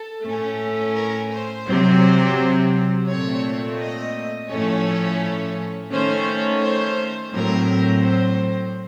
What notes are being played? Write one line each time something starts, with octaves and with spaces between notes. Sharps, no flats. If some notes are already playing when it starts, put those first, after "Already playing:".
Already playing: A4
A2 A3 C#4
A#4
C5
C3 F#3 C4
A#2 A3 C4 C#5
D#5
A2 F3 A3 C#4 C#5
D#3 A3 C#4 C5
C5
A2 F#3 C4 A#4
C5